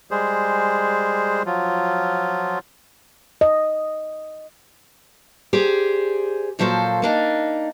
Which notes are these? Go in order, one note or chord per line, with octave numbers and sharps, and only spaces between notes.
G3 G#3 G#4 C5
F3 F#3 F4
D#5
G4 G#4 C5 D5
A#2 F3 F#3 A4 B4 C5
A#3 D4 D#4